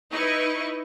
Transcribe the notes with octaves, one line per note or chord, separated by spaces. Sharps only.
D#4 E4 B4 D#5 C#6